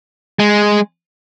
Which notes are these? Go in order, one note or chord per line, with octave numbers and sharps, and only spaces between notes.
G#3